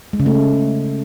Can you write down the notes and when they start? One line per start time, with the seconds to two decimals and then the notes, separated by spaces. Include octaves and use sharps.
0.13 G#3
0.20 C#3
0.26 A3